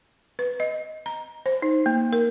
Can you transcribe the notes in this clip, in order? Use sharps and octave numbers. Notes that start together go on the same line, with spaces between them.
B4
D#5
A#5
C5
D#4
A#3
A#4